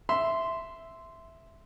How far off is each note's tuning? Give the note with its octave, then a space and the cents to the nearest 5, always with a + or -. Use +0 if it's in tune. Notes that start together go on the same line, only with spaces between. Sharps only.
E5 +0 C6 -10